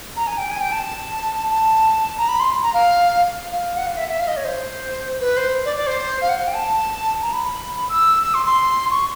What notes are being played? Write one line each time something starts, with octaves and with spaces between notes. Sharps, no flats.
A#5
G#5
G5
G#5
G5
A5
A5
A#5
B5
C6
A#5
F5
F5
F#5
F5
E5
E5
F5
D#5
C#5
C5
B4
C5
D5
D5
C5
F5
F#5
F5
G5
A5
A#5
B5
B5
E6
E6
C6
C6
C#6